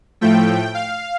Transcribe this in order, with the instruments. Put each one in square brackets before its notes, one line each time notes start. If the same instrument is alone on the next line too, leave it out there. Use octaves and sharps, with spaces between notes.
[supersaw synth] A2 F3 A3 G5
F5